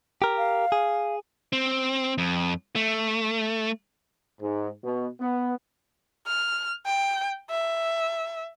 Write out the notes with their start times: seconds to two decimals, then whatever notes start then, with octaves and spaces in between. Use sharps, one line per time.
0.22 G4 A#4
0.38 F5
0.72 G#4
1.53 C4
2.18 F2
2.76 A3
4.40 G#2
4.83 B2
5.19 B3
6.27 F6
6.86 G5
7.50 E5